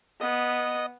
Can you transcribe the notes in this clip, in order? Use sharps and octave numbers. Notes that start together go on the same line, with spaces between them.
B3 D#5